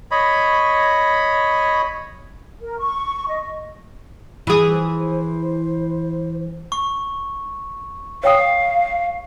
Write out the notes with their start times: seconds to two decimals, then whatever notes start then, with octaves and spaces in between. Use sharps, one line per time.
0.11 C#5 D#5 B5
2.61 A#4
2.79 C#6
3.29 D#5
4.47 E3 G#4
4.72 C5
6.72 C#6
8.24 C#5 F5 G5 D#6